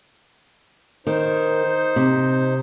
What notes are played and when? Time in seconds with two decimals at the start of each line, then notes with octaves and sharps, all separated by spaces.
1.07 D#3 D#4 C5
1.96 C3